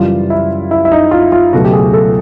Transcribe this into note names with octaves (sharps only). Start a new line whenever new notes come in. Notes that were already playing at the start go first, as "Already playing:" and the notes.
Already playing: F#2 C#3 E3 G3 F4
E4
E4
E4
D#4
F4
F4
C#2 B2 F#3 A3 F#4
G4
G#4
A4